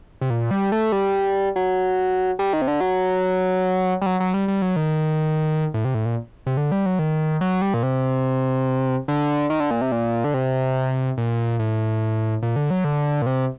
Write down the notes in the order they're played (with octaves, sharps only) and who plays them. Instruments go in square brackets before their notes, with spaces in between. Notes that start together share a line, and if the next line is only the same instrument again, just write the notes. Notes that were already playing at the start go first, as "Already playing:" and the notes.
[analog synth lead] C3
A#2
G3
A3
G3
F#3
G3
D#3
C3
D3
F#3
G3
F#3
F#3
G3
G3
F#3
D#3
A2
C3
A2
A#2
C3
D3
G3
F#3
D#3
F#3
G3
A#2
C3
D3
D#3
D3
A#2
C3
A#2
D3
C3
A#2
A2
A#2
D3
F#3
D3
A#2
C3